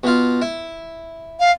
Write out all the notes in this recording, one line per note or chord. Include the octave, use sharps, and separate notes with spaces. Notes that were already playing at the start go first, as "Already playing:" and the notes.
B2 F4
E4
F5